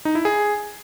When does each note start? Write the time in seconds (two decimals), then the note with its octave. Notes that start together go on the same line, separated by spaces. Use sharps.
0.05 D#4
0.15 E4
0.25 G#4